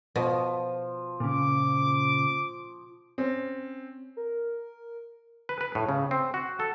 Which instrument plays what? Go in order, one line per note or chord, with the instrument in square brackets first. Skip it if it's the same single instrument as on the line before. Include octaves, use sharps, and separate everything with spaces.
[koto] B2 [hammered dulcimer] F3
[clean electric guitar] A#2 C#3 [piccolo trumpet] D6
[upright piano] C4 C#4
[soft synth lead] A#4
[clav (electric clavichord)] B4
B4
A2
C#3
C4
F#4
A4